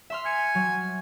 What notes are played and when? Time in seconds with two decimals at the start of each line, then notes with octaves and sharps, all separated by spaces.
0.10 E5 C6 F6
0.26 G#5 C#7
0.55 F#3